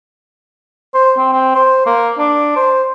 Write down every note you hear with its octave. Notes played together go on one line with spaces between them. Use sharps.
C5
C4
C4
C5
A#3
D4
C5